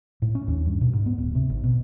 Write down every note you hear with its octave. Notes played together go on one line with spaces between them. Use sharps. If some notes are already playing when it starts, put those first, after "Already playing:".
A2
C#4
D#2
G2
B2
G#2
B3
D1
C3
G#1
B2